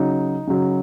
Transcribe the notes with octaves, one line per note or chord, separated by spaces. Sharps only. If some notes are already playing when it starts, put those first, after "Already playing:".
Already playing: C#3 F#3 D#4
C#3 F#3